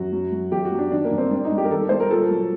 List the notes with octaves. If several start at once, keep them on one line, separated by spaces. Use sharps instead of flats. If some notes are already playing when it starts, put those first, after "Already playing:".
Already playing: F#2 F#4
F#3
F#3
F#2 G4
F#4
F#3
D4
D#3 D4
A#3
G2
C4
G3 D4
D#4
G3
G4
A#4
D#3 A4
G3 C5
A#4
A#2 A4
F#3